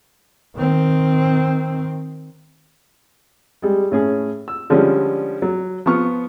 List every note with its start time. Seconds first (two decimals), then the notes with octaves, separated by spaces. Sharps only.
0.56 D#3 C4
3.62 G3 G#3
3.92 A2 C#4 G#4
4.48 E6
4.70 D3 F3 G3 G#3 C#4
5.42 F#3
5.86 F3 B3 C#6 F6